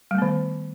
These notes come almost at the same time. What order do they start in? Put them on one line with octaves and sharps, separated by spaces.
G3 A3 B3 D#3